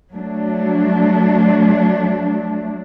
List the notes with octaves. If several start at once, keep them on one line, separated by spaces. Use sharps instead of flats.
F#3 A3 D4